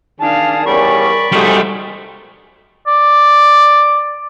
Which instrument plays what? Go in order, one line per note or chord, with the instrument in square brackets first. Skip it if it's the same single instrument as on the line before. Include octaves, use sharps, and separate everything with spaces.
[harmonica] D#3 G#4 A5 [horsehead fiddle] D4 F5
[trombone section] E2 G3 C#4 [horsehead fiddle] A#4 [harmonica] D5 B5 C#6
[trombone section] G#2 D#3 A3 [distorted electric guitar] G3 G#4 [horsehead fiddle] F#4 C5
[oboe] D5